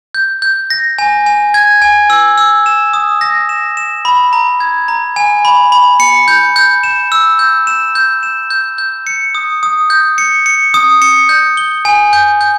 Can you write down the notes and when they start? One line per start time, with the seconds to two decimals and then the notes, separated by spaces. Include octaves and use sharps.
0.14 G6
0.42 G6
0.70 A#6
0.98 G#5
1.26 G#5
1.54 G#6
1.82 G#5
2.10 E6
2.38 E6
2.66 E7
2.93 D#6
3.21 A#6
3.49 E7
3.77 E7
4.05 B5
4.33 A#5
4.60 G#6
4.88 A#5
5.16 G#5
5.45 B5
5.72 B5
6.00 C#7
6.28 G6
6.56 G6
6.83 E7
7.12 E6
7.39 G6
7.67 E7
7.95 G6
8.23 E7
8.50 G6
8.78 G6
9.07 C#7
9.35 D#6
9.63 D#6
9.90 G6
10.18 C#7
10.46 C#7
10.74 D#6
11.02 C#7
11.29 G6
11.57 G7
11.85 G#5
12.13 G6
12.41 G6